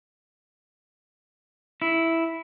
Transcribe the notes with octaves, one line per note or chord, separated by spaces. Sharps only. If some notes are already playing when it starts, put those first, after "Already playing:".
E4